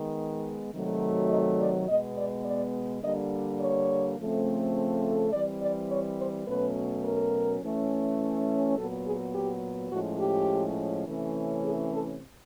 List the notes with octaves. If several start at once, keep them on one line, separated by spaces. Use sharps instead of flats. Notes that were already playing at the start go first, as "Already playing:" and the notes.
Already playing: D#3 G#3 B3
C3 D#3 F#3 A3
D#5
D5
B2 G#3 B3 D#5
D5
D5
D3 G3 A#3 D#5
C#5
C#3 F3 A3 C4
E3 G3 C4 D5
D5
C#5
C5
B2 F#3 A3 C#4 B4
A#4
E3 A3 C#4
A#2 F#3 B3 A4
G#4
G4
A2 F3 G#3 C#4 F#4
G4
C3 E3 A3 C#4
G#4
A4